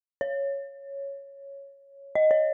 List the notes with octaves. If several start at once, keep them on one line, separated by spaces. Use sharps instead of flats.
C#5
D#5
C#5